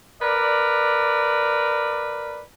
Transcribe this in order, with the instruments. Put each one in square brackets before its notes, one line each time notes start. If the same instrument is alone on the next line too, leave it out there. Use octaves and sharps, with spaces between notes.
[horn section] A#4 B4 D5